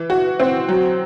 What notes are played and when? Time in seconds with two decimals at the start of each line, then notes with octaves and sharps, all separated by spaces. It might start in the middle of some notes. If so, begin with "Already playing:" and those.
Already playing: E3
0.10 F#4
0.40 C4
0.69 F#3